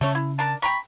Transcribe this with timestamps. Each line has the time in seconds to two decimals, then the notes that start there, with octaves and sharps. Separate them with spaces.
0.01 C#3 A3 C#4 C#5
0.15 E4
0.39 D4 A#4 A5
0.62 G5 A#5 B5 C#6